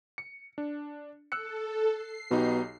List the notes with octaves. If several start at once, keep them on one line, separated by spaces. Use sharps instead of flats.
C#7
D4
A4 E6 F#6 C#7
C7
B1 B2 D#4 G4